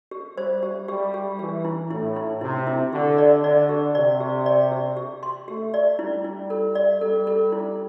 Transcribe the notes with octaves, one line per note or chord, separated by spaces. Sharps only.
G4
G3 C5
G4
G3 G4
G4
E3 G4
E4
A2 E4
E4
C3 E4
E4
D3 G4
D5
D3 D5
G4
C3 D5
G4
D5
G4
G4
C6
A3 G4
D5
G3 E4
E4
A4
D5
G3 A4
A4
E4